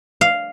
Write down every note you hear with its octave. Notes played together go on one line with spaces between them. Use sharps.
F5